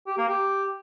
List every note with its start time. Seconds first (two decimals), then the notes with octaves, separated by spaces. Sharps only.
0.07 G4
0.18 A#3
0.29 G4